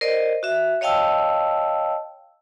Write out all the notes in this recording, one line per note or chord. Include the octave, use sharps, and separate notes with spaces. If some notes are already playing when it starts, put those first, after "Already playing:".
A#4 C5 D5 D#5
F#4 E5
C#5 D#5 F5 G5 A5 E6